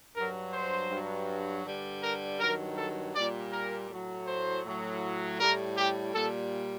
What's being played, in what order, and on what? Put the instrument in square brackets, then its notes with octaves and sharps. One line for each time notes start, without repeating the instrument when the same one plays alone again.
[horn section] G2 F#3 A#4
C5
G2 F#3
G2 D3 G3
A#4
G2 D#3 F#3 A#4
A4
A#2 G3 D5
A#4
A2 F#3
C5
A2 F#3
A2 G3 A#4
G4
A#2 G3 A4